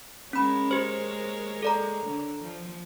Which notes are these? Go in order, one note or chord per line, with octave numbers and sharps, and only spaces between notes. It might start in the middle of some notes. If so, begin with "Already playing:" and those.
G#3 C#4 A#4 C#5 B5
G4 C5
A4 D5 A#5
D3
F3